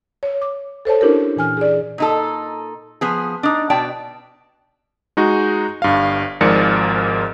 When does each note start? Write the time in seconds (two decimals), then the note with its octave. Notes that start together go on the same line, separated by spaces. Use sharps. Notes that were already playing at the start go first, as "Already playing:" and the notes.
0.23 C#5
0.42 D6
0.85 A4 C5 C#5 A5
1.01 C#4 D4 E4 G4 A#4
1.36 A#2 E3 G#5 F6
1.57 G#4 D5
1.98 A#2 D#4 A4
3.01 F3 B3 G#4
3.43 D4 D#4
3.70 B2 D5 G5 A5
5.17 G#3 D#4 F#4
5.82 G1 G2 F5
6.41 G#1 G#2 F3 A#4 D5 C#7